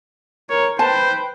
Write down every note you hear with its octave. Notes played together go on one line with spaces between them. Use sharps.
A#4 C#5
B4 C5 G5 A5